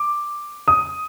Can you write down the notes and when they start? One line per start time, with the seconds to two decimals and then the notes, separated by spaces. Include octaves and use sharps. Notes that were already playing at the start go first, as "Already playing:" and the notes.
Already playing: D6
0.68 D#6